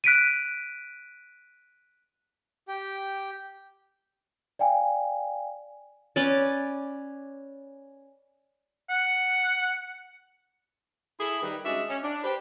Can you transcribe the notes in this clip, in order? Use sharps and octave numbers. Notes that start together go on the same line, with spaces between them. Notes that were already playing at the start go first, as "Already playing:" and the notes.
F#6 B6 D7 D#7
G4 G5
D5 F5 G5 G#5
C#4 B4 D5
F#5
E4 G#4 A4
D#3 G3 D#4 B4
G#3 C#4 D4 F#4 D#5 E5
C#4
D4
G4 B4 C5